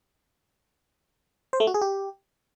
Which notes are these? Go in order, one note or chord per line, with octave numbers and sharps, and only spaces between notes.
C5
A3
F#4
G#4
G4